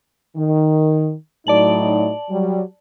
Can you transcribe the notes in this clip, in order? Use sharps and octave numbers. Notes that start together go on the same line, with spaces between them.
D#3
A2 F#3 D#4 D5 A5 F#7
F#3 G3